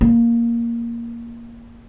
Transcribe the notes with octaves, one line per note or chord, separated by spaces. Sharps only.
A#3